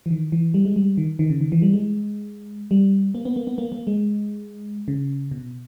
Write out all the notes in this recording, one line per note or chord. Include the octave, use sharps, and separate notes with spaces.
E3
D#3
E3
G3
G#3
G3
D#3
D#3
C#3
D#3
E3
G3
G#3
G3
A#3
B3
A#3
B3
A#3
A#3
G#3
C#3
B2